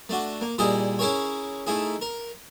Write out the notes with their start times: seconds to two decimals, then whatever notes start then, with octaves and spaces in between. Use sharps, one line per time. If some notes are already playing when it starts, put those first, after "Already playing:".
0.09 A3 D4 F#4
0.41 A#3
0.58 A#2 G3 E4 G#4 D#5
0.99 C#4 E4 G#4 A#4 C#5
1.67 A3 D#4 E4 G#4
2.01 A#4